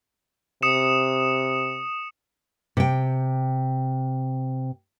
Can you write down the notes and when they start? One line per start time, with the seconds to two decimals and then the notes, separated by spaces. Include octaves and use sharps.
0.63 C3 D#6 C#7 E7
2.77 C3 G5